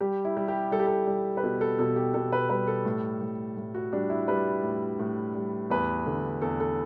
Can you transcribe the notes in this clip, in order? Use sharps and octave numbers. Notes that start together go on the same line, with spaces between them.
G3 G4
E4
G3
G4
G3 A4
G4
A4
G3
B4
B2 A4
A4
B2 A4
G4
B2 A4
B4
G3 B4
A4
A2
A2
A2
F#4
G3 D4
E4
G3 B4
A2
A2
G3
E2 B4
D3
E2 A4
A4